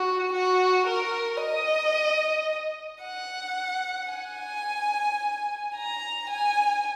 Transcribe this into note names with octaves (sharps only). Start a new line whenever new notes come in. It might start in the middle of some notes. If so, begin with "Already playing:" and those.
Already playing: F#4
F#4
A#4
D#5
F#5
G#5
A#5
G#5